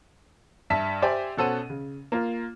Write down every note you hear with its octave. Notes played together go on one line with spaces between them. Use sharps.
G2 E5 A5 B6
G4 C5 D5 E5 G#5
B2 C#4 A4 C5 F#5 D#7
C#3
A#3 F4